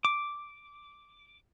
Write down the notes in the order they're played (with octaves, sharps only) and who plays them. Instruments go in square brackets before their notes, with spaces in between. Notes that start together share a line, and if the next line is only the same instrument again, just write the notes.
[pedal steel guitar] D6